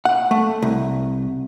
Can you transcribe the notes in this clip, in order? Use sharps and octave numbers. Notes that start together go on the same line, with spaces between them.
F#5
A3
C2